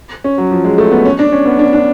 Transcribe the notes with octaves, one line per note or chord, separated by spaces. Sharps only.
C#4
F#3
F3
G#3
A3
B3
C#4
D4
C#4
B3
D4
D4